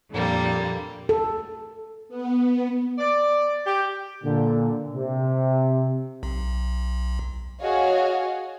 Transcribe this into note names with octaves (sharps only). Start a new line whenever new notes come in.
F2 A#2 D3 G3 A#3
A4
B3
D5
G4
A#2 D3
C3
B1
F#4 G#4 C#5 D#5 F5